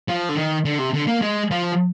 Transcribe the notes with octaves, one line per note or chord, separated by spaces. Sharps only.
F3
D3
D#3
D3
C3
D3
A#3
G#3
F3